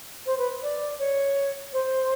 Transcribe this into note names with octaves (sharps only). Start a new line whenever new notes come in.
C5
B4
D5
C#5
C5